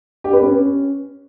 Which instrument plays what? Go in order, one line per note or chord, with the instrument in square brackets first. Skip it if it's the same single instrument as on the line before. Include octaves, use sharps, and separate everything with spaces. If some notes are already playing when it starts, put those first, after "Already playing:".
[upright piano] G4
B4
C#4